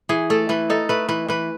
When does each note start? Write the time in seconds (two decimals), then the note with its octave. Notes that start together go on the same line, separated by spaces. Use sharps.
0.09 E3 G#4
0.30 A3 A4
0.49 E3 B4
0.70 D#4 A4
0.89 A3 B4
1.08 E3 B4
1.28 E3 B4